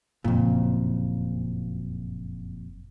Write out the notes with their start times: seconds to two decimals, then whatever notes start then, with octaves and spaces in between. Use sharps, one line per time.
0.24 F#1 F2 A#2